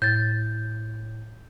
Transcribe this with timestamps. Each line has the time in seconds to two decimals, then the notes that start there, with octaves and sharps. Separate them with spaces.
0.02 A2 G6 A6